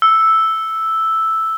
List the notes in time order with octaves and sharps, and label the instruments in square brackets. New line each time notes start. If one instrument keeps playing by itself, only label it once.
[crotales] E6